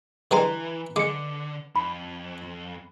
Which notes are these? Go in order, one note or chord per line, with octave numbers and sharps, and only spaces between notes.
D3 E3 G3 G#3 B4 A#5 C6
D3 G#3 D6 C#7
F2 B5